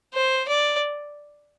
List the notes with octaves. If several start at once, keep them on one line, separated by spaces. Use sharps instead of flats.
C5
D5